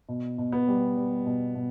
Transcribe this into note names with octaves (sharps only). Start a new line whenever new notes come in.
B2
B2
B3
G3
G3
B2
B2